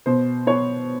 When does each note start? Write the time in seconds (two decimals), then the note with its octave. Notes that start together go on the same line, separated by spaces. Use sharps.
0.06 B2 C5
0.47 B3 C#5